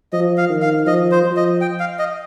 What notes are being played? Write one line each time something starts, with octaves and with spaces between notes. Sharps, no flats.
F3 D#5
F5
D#3
F5
F3 D#5
C5
F3
D#5
G5
F5
D#5